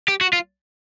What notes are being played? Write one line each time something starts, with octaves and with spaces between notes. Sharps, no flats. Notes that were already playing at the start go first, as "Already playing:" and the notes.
G4
F#4
F4